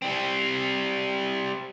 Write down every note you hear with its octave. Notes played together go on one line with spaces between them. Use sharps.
G3 C4